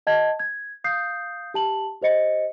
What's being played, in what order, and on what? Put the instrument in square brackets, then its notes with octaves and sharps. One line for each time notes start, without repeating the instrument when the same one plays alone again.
[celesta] D#5 F#5 A5 G#6
G#6
F5 D#6 G6 C7
G4 A5 F#7
G4 C5 D#5 C#7